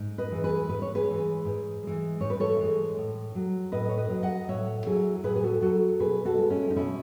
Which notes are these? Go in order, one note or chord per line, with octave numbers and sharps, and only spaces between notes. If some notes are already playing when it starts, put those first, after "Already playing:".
Already playing: G#2
B4 D#5
E3 G#3
G#4 B4
G#2 B4
C#5
G#4 B4
E3 G#3
G#2
E3 G#3
G#2 C#5
B4
A4 C#5
E3 G#3
A2
F#3
A2 B4 D#5
C#5
B4 D#5
F#3
D#5 F#5
A2 C#5 E5
F#3 E4 G#4
A2 G#4 B4
G#4
F#4 A4
F#3 F#4 A4
B2 G#4 B4
F#4 A4
G#3
C#4 E4
D#4
B2 C#4 E4